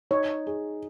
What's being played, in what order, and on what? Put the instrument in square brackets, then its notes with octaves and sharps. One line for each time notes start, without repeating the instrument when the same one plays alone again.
[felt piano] D#4 [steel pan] C#5
[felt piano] G#4